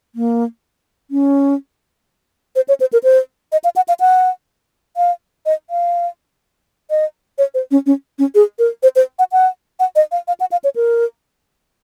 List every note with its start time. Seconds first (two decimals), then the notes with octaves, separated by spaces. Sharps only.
0.15 A#3
1.11 C#4
2.56 C5
2.68 C#5
2.80 C5
2.93 A#4
3.04 C5
3.52 D#5
3.64 F5
3.76 F#5
3.88 F5
4.00 F#5
4.97 F5
5.46 D#5
5.70 F5
6.90 D#5
7.38 C#5
7.54 C5
7.71 C#4
7.86 C#4
8.19 C#4
8.35 G#4
8.59 A#4
8.83 C5
8.96 C5
9.19 F#5
9.32 F#5
9.80 F#5
9.96 D#5
10.12 F5
10.28 F5
10.40 F#5
10.52 F5
10.64 C#5
10.76 A#4